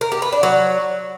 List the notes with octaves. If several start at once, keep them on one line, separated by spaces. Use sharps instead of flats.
A#4
G4
B4
D4
F#3